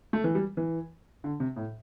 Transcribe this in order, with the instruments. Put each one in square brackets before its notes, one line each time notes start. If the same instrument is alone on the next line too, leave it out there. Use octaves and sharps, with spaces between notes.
[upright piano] A3
E3
G3
E3
D3
C3
A2